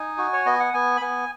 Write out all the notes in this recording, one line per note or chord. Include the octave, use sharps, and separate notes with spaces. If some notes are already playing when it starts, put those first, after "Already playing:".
Already playing: D#4 G#5
F#4
C#5
B3 D#5
F#5
B3 G#5
B5
B3 G#5